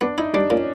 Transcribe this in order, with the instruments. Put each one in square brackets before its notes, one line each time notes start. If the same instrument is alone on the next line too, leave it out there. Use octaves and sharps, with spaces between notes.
[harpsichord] B3 [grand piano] D4
[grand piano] D#4 [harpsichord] E4
[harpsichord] G3 [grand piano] D4
[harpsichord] A#2 [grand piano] C#4